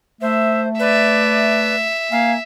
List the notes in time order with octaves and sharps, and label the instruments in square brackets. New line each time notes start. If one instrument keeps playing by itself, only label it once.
[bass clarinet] A3 [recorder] C5 [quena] E5
[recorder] B4 [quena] D5 [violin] E5
[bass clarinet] A#3 [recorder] F5 [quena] G#5